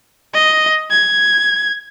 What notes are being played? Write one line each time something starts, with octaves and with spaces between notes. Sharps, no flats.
D#5
G#6